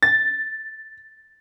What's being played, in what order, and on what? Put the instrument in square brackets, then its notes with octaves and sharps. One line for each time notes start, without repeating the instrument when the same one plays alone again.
[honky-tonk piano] A6